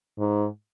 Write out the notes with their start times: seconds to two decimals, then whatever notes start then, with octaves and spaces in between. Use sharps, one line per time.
0.18 G#2